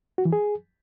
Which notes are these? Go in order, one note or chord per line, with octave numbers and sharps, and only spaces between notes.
F#4
E3
G#4